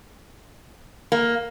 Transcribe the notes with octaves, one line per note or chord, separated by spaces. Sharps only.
A#3